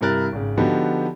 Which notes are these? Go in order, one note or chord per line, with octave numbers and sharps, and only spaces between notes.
G2 C3 E4 A#4 F#6 A6
G#1 C#3
D3 F3 B3 D#4 F#4 G4